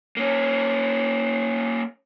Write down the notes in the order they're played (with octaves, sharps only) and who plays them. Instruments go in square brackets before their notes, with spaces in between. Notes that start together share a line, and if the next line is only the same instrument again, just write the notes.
[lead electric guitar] A#3 C#4